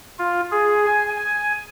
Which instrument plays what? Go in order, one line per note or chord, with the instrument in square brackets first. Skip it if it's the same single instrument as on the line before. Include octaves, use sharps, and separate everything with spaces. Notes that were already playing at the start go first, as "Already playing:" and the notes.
[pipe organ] F4
G#4
G#5
G#5